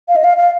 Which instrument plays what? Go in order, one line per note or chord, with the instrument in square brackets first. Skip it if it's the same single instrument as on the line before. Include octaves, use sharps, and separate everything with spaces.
[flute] F5
D#5
F5
F5